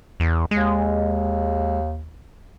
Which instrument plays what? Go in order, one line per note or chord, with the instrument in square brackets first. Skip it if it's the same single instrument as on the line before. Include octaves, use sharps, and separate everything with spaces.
[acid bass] E2
[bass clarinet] D#2 [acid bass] G#3